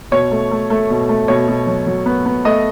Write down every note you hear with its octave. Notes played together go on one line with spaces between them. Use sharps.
B2 C#5
A3
A3
A3
B2
A3
B2 C#5
B2
F#3
F#3
B3
B3
A3 D#5